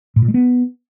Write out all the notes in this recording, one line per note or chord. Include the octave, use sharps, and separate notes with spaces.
A2
A#2
G#3
B3